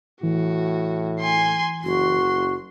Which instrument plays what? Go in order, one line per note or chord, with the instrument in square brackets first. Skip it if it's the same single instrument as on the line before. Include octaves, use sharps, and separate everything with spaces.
[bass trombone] A2 [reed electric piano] E3 [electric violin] F#4
[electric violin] G#5 C6
[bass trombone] F#1 [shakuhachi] F#4 [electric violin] C6